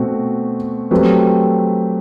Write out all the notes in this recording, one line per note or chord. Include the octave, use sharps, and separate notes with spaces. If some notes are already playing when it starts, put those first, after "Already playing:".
Already playing: B2 A3 C4 F#4
F#3 A3 C4 G4 B4